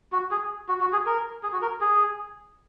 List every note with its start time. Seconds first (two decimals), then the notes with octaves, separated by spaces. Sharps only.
0.12 F#4
0.31 G#4
0.69 F#4
0.81 F#4
0.93 G#4
1.06 A#4
1.43 G#4
1.53 F#4
1.62 A#4
1.81 G#4